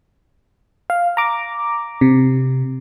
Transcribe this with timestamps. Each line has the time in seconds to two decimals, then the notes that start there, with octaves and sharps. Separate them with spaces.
0.90 F5
1.17 A#5 D6
2.01 C3